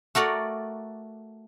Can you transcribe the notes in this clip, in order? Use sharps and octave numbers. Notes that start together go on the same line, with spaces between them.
A3 F#4 A#4 D5